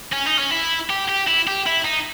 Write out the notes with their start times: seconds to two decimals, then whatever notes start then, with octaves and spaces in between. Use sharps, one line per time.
0.13 C#4
0.26 D#4
0.39 C#4
0.51 E4
0.90 G4
1.09 G4
1.28 E4
1.47 G4
1.66 E4
1.84 D#4